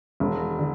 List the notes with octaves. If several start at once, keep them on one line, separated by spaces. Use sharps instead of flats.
E1
D3